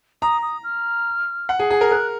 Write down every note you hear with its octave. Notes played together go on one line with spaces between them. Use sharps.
A#5 D#6
D#6
F6
F#5
G#4
G#4
A#4
A#4 F#6